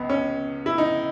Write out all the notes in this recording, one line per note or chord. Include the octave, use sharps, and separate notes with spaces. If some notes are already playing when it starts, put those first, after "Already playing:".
Already playing: C#2 B3
C#4
E4
D#4